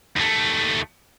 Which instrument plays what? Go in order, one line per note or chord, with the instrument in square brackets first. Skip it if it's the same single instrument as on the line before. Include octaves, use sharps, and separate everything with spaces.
[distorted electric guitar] D#2 A3